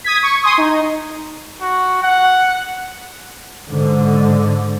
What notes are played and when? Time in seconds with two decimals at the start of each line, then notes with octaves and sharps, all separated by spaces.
0.04 D#6 G#6 B6
0.23 C#6
0.43 G#5 C6 D#6
0.58 D#4
1.61 F#4
2.02 F#5
3.68 G#2 D3